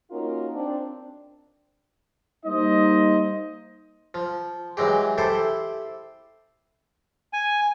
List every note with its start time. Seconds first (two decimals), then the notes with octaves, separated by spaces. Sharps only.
0.11 A#3 C#4 D#4 F4 F#4 A#4
0.53 C4 D4
2.46 G3 A#3 D#4 C5 D#5
4.14 F3
4.77 E3 F#3 G#3 G4
5.18 E4 G4 A4 C5
7.33 G#5